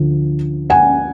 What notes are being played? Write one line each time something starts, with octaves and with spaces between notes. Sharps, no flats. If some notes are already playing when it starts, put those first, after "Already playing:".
Already playing: D2 D3 F3
F#5 G#5